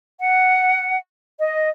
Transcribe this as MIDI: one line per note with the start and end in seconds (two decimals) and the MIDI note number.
0.20 0.96 78
1.39 1.69 75